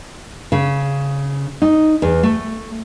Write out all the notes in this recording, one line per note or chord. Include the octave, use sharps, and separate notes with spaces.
C#3
D#4
E2
A3